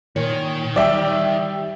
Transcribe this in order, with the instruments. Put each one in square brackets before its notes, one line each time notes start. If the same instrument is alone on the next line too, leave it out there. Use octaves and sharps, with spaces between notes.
[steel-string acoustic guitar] A#2 C#5 [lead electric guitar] D#3
[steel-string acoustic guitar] G3 [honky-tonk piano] D5 E5 G5